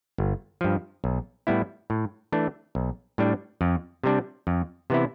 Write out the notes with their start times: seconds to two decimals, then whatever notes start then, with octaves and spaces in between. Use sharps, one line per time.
0.18 G1
0.61 G2 F3
1.04 B1
1.47 A2 G3 B3 E4
1.90 A2
2.32 E3 A3 D4
2.75 B1
3.18 A2 G3 D4
3.61 F2
4.04 C3 G3 D4
4.47 F2
4.90 C3 E3 B3 E4